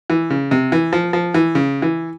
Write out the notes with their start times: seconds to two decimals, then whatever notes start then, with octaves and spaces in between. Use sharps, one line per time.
0.10 E3
0.30 C#3
0.51 C3
0.72 E3
0.93 F3
1.13 F3
1.34 E3
1.55 C#3
1.82 E3